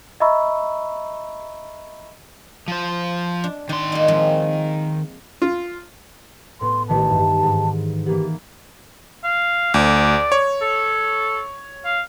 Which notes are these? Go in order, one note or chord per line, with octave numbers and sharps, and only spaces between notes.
D#5 E5 A#5 B5 C#6 E6
F3 C5
D4
D#3 D4 C6
A#3 D#4
F3 G#3 C4
F4
A2 B3 C6
A1 D#3 E3 A5
G2
G#2
E3 A#3 B3 G4
F5
D2 D5
C#5
A4
F5